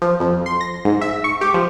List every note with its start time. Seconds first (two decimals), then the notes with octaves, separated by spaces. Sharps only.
0.02 F3
0.20 F2
0.46 C6
0.61 A#6
0.85 G#2
1.01 E5
1.24 C#6
1.41 G4
1.54 F3